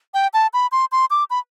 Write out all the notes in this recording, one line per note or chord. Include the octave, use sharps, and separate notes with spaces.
G5
A5
B5
C6
C6
D6
B5